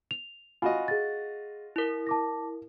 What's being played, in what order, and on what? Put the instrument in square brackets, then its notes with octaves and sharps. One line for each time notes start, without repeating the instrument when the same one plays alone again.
[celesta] F7
[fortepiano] F4 F#4 D#5 [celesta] G#5 B5
[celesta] G#4 A6
[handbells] E4 A#4
[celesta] A5 D6 A#6